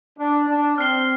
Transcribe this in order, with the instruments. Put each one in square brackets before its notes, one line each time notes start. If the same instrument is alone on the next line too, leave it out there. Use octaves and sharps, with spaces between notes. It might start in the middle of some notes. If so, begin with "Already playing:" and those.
[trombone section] D4
D4
[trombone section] C4 [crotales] F6 C7 G7